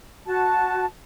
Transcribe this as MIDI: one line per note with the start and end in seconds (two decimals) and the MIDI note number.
0.26 0.85 66
0.26 0.85 81